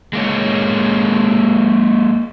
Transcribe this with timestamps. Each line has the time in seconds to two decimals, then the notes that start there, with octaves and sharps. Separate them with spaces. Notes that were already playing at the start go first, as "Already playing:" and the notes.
0.13 G#3 A#3 E4 C#5